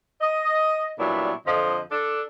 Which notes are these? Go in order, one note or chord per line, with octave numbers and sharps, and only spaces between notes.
D#5
A#2 F#3 G3 B3 D4 E4
F2 D3 F3 C5 D#5
D4 A4